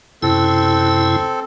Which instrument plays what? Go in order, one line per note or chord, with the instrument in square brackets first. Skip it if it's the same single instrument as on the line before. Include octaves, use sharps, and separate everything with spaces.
[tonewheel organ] F#2 C3 E4 [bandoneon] C4 A4